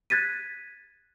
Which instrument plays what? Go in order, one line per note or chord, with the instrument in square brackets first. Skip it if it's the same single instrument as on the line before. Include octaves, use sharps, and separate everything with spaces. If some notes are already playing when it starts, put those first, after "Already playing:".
[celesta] F#6 G#6 A6 B6 D#7